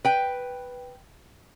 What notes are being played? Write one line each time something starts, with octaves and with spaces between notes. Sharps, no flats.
B4 G5